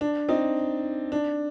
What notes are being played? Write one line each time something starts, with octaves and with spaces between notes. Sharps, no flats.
D4
C4 D#4
D4